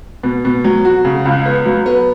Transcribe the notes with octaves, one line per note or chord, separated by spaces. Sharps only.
B2
B2
F#3
F#4
C#3
C#2
B3
F#3
B3